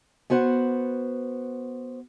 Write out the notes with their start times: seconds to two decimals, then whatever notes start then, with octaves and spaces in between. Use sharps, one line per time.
0.30 B3 F#4 C5 F#5